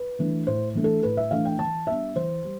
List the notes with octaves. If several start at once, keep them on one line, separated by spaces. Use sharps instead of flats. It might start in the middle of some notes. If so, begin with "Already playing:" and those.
Already playing: B4
E3 A3 D4
A2 C5
E3 A3 D4
A4
A2 B4
E5
E3 A3 D4 F5
G5
E3 A5
G3 B3 D4 E5
E3 C5
G3